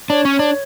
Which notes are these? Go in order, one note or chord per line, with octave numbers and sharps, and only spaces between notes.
D4 C#5
C#4
D4